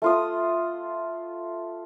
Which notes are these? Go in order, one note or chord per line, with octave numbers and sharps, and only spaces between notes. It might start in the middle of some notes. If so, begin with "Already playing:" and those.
A3 F4 D#6